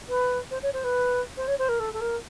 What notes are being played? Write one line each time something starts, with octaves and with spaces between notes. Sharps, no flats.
B4
C5
C#5
C5
B4
C5
C#5
C5
A#4
A4
A4
A#4